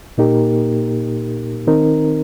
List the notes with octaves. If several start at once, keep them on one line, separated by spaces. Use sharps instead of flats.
A#2 A#3 D#4 G4 A#4
D#3 C4 D#4 A#4